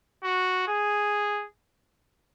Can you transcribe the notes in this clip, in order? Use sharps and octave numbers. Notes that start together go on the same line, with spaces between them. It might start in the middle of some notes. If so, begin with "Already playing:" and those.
F#4
G#4